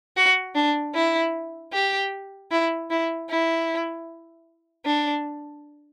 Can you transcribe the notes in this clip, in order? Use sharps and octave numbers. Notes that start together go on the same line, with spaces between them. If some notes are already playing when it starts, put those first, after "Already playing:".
F#4
D4
E4
G4
E4
E4
E4
D4